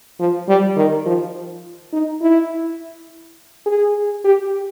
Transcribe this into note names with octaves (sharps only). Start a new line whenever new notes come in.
F3
G3
D#3
F3
D#4
E4
G#4
G4